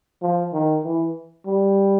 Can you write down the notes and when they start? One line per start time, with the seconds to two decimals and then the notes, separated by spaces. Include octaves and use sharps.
0.22 F3
0.53 D#3
0.84 E3
1.46 G3